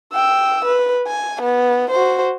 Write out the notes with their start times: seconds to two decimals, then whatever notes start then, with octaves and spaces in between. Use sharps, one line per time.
0.14 G5 E6
0.65 B4
1.07 G#5
1.42 B3
1.91 F#4 C5